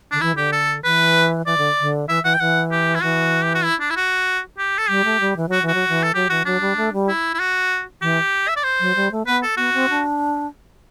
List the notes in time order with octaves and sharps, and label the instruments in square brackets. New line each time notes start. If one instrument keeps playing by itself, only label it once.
[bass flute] D3 [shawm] D4
[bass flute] E3 [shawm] E4
[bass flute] D3 [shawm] G4
[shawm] A4
[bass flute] E3 [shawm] B4
[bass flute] E3 [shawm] D5
[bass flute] D3
D3
[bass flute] E3 [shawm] E5
[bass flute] E3 [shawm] F#5
[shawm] G5
[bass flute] E3 [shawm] F#5
[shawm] G4
E4
[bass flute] E3 [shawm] F#4
[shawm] G4
F#4
E4
D4
E4
F#4
G4
A4
[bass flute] G3 [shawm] G4
[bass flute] A3
G3
E3
[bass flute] F#3 [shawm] F#4
[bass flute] E3
[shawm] F#4
[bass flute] F#3
E3
[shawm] A4
[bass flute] F#3 [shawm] G4
[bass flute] E3 [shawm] F#4
[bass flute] F#3 [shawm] D4
[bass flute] G3
A3
G3
[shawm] E4
E4
F#4
[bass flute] E3 [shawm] G4
[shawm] E5
D5
C5
[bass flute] F#3
G3
A3
[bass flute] B3 [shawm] B4
[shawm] A4
[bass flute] B3 [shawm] F#4
[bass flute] C4
D4